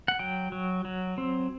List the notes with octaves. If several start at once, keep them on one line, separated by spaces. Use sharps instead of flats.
F#5
F#3 G5
F#3
F#3
C4